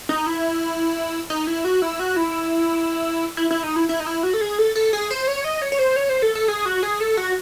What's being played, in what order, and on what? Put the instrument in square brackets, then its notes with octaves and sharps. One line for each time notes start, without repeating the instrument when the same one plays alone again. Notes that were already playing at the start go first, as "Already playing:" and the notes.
[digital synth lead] D#4
E4
D#4
E4
F#4
E4
F#4
E4
E4
E4
D#4
E4
E4
D#4
E4
F#4
A4
G#4
A4
A4
G#4
C5
C#5
D#5
C#5
C#5
C5
C#5
C5
A4
A4
G#4
F#4
G#4
A4
F#4